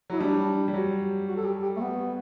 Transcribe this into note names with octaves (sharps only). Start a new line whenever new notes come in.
F#3 E4
G3 D4
G3
F#3
F#4
A4
G4
G4
A3
B3